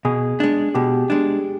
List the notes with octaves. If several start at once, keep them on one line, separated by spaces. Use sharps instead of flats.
B2 G#4
G#3 D4
B2 G4
G#3 D4